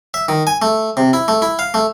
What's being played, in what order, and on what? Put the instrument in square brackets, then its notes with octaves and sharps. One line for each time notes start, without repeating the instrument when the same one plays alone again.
[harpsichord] E5
D#3
G#5
A3
C3
E4
A3
E4
F5
A3